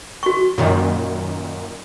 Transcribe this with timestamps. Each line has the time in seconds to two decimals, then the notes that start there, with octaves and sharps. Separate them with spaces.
0.23 F#4 C#6
0.58 F#2 A#2 D#3